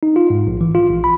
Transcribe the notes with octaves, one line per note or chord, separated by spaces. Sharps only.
D#4
F4
G#2
A#1
E3
F4
A#1
B5